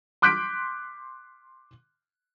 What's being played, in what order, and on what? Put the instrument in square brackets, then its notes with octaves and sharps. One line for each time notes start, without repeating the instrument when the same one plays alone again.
[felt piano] C6 D6 F#6 G6 B6 D7